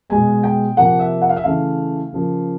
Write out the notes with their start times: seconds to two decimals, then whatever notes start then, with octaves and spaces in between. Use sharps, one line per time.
0.10 B2 G#3 B3 G#5
0.43 G5
0.77 C3 F3 A#3 F#5
0.99 E5
1.22 F#5
1.29 F5
1.36 E5
1.44 C#3 E3 A3 F5
2.12 C#3 F3 A#3